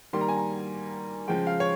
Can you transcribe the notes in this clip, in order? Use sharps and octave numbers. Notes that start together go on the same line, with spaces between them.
D#3 G3 A#3 C6
A#5
G#5
A#5
C#3 F3 G#3 G5
F5
C#5